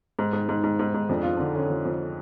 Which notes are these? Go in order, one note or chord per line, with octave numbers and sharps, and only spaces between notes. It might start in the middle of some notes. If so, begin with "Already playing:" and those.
G#2
G#2
G#2
G#2
G#2
G#2
F2 D4
F2 F4
D3 D4
D3 C#4
F2
F2